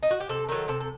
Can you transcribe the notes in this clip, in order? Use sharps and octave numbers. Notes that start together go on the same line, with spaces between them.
D#4
F#4
G4
C3 A4
D#3 F#3 A4
C3 A4
A4